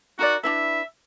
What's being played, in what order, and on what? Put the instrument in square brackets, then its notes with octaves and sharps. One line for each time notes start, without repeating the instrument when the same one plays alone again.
[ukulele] D#4 A#4 D5 [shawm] F#4
[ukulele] D4 E4 B4 [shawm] E5